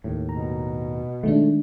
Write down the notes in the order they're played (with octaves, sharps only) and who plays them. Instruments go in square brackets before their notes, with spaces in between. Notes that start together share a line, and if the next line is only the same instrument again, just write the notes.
[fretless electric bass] D#2 A2
[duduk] B2 [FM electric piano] A#5
[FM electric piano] D#3 G#3 D4 [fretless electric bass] A3